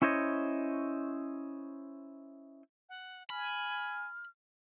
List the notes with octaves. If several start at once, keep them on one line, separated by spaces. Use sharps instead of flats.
C#4 E4 C5 C#5 D#5
F#5
G#5 B5 F6